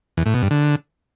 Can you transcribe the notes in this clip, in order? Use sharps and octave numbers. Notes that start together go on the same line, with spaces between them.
E2
A2
B2
G2
D3